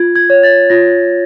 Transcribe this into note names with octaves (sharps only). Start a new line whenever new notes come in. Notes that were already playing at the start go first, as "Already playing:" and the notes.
Already playing: F4 G#6
G#6
C#5
A6
F4 A#6